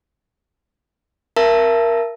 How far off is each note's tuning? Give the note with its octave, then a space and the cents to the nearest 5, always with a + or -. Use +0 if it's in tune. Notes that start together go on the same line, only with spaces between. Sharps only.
A#4 +5 E5 +35 A5 +0